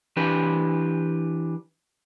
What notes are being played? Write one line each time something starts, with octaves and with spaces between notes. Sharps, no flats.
E3 D4 G4 B4